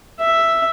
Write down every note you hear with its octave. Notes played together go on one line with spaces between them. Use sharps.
E5